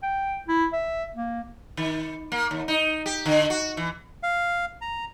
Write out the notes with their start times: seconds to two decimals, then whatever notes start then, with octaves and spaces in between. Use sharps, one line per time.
0.03 G5
0.48 E4
0.73 E5
1.16 A#3
1.77 D#3
2.32 A#3
2.51 D#2
2.68 D#4
3.06 G4
3.26 D3
3.50 F#4
3.77 E3
4.23 F5
4.81 A#5